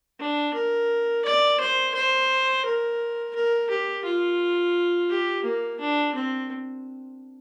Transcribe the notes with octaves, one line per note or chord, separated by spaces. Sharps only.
D4
A#4
D5
C5
C5
A#4
A#4
G4
F4
G4
A#3
D4
C4